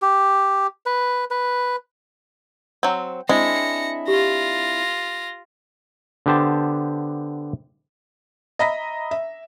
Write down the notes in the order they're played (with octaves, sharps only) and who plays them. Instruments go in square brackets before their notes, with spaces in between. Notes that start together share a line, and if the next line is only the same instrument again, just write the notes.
[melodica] G4
B4
B4
[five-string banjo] F#3 C4
[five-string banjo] G#3 [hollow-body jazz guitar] C4 D4 E4 [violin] A#6 C#7
[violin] F4 A#6 [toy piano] G4
[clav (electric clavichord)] D3 B3 G4 C5 A5
[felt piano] D#5 E5 A#5 B5 A#6 B6
E5